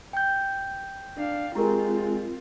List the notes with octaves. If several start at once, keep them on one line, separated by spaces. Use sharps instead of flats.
G5 G6
D4 F5
G#3 C4 E4 F4 G4 A#4